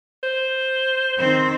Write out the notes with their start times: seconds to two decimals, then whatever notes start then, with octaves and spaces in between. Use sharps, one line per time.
0.23 C5
1.18 D#3 C4